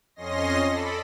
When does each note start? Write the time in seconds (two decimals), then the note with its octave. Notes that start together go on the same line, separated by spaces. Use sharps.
0.16 F2 C#4 D#5 C6 A#6
0.69 A4 D5 B5